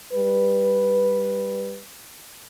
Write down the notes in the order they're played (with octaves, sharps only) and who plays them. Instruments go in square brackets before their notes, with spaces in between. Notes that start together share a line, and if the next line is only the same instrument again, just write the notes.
[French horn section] G3 B4